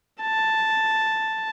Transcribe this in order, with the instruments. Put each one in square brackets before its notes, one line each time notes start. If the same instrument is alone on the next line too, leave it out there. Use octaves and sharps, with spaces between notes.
[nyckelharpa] A5